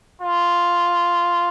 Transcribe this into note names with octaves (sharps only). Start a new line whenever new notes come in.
F4